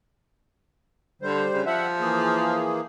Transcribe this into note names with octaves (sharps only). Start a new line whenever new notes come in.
D3 G3 C5
C#3
F3 E5 F#5
E3 A#3 G#4